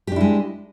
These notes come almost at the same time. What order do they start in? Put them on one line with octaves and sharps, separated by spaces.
G4 D4 E4 G#3